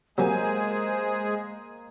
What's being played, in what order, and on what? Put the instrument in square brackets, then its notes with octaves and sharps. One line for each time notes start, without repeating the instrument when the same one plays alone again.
[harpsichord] C3 F#3 [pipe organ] G#3 G#4 [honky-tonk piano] A#3 A#4 G#5 [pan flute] C5